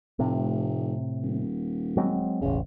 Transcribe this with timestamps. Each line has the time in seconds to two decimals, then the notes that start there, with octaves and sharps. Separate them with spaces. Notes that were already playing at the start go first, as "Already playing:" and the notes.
0.19 F1 A2 C3
1.22 D#1
1.97 F#3 G#3 C4
2.41 E1 A1 C#3